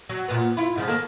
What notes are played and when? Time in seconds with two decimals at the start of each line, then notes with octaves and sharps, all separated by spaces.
0.09 F#3
0.28 A#2 B3
0.57 E4 F4
0.75 G#2 C#3 F3
0.88 D#3 A#3 A4